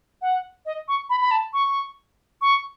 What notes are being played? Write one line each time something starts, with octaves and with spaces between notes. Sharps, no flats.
F#5
D#5
C#6
B5
B5
A5
C#6
C#6